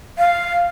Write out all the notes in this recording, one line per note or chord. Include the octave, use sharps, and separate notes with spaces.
F5